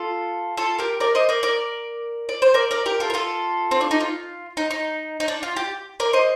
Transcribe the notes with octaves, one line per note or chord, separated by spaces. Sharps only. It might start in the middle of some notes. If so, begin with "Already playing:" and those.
Already playing: F4 A4
F4 A4
G4 A#4
A#4 D5
C5 D#5
A#4 D5
A#4 D5
D5
C5
A#4 D5
A#4 D5
G4 A#4
F4 A4
A#4
F4 A4
C4
D4
D#4
F4
D#4
D#4
D#4
D4
F4
G4
A#4 D5
C5 D#5